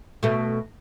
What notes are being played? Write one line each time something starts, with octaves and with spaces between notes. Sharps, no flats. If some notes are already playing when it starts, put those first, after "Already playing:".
B2 A3